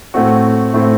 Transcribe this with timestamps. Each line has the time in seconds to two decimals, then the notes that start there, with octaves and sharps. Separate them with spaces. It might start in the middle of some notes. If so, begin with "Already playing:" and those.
0.14 A2 A3 C4 F#4
0.74 A2 A3 C4